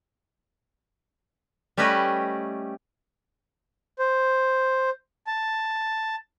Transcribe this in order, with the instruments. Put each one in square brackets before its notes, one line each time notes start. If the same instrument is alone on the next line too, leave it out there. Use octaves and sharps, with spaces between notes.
[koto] G3 A3 C#4 G4 B4 D#5
[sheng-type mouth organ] C5
A5